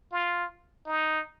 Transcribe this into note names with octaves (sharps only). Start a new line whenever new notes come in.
F4
D#4